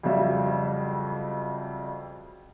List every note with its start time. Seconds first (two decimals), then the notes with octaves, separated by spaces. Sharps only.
0.03 F2 C#3 F#3 G3 E5